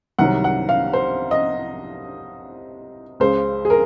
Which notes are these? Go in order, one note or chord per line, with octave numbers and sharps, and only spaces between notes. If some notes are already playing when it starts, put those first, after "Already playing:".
C2 C3 D#3 F#3 F#5
F#5
F5
C5
D#5
C#2 C#3 G#3 C5
G#4
A#4